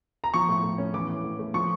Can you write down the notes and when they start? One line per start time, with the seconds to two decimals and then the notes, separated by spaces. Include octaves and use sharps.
0.24 A#5
0.34 F3 C#6
0.49 A2
0.63 A2
0.78 C#4
0.94 E3 D6
1.08 A2
1.24 A2
1.39 A3
1.54 F3 C#6